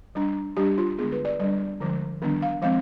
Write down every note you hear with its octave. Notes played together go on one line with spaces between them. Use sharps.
G3 D4
G3 D4 G4
F4
D3 G#3 B3 G#4
B4
D5
G3 D4 D5
D3 F3 G#3
D#3 G3 B3 D4
F5
F3 G#3 C4 F5